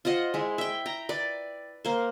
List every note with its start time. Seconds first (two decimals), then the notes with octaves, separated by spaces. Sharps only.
0.05 F4 C5 D#5 F#5
0.34 G#3 E4
0.58 E5 G5
0.86 G5 A#5
1.09 B4 D5
1.85 A#3 C5